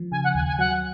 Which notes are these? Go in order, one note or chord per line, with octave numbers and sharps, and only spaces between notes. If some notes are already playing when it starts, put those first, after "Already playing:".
Already playing: F3
C#3 G#5
F#5
D#2 G#5
G#5
F#3 F#5